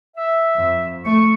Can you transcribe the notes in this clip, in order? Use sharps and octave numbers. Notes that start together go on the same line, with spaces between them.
E5
F2
A3 C#6